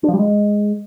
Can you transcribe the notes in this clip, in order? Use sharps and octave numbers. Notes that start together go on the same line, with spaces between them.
D4
F3
G3
G#3